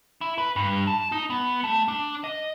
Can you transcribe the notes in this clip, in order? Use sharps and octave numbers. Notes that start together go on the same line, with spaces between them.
E4
B4
G2
A5
D#4
B3
A3
D4
D#5